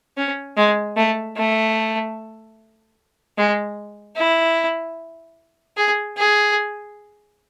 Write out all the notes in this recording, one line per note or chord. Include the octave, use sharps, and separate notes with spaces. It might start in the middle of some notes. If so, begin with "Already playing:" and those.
C#4
G#3
A3
A3
G#3
E4
G#4
G#4